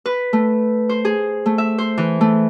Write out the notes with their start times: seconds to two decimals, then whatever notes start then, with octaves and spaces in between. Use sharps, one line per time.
0.06 B4
0.33 A3
0.89 C5
1.05 G#4
1.46 A3
1.58 E5
1.78 C5
1.98 E3
2.21 A3